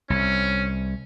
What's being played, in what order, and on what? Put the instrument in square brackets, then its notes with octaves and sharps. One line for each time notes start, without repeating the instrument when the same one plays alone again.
[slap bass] C2 [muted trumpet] C#4